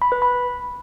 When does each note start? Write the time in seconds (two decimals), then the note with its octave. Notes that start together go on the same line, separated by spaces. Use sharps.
0.02 B5
0.12 B4
0.22 B5